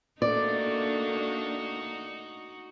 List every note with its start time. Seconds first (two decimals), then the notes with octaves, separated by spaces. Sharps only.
0.22 A3 A#3 D4 D#4 F#4 D5